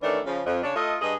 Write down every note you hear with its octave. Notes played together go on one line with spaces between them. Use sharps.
D#3 E3 A3 C#4 D4
C#3 F3
F2
C#3 D4 C#5
A3 F4 A4 D#5
G2 G#4 D#5